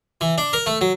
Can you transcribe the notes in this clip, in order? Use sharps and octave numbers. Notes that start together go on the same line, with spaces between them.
E3
D4
A#4
A3
F#3